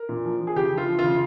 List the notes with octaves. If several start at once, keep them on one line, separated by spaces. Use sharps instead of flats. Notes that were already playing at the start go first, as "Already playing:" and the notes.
Already playing: A#4
A#2
F3
F3
G#4
C#3 G4
F3
F4
F3
F4
C#3